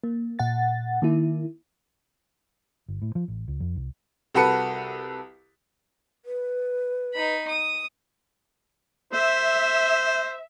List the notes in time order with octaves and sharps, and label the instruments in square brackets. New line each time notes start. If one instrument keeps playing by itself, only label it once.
[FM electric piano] A#3
A#2 F#5 A6
D#3 A#3 E4
[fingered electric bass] G1
A2
F3
A1
C#2
F2
C2
[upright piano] C2 F#4 A4 B4 C#7
[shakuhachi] B4
[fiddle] D#4 B5
D#6
[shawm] C5 [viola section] E5